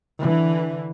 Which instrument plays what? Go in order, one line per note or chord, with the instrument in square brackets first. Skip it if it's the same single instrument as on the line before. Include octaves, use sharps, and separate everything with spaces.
[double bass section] D3 E3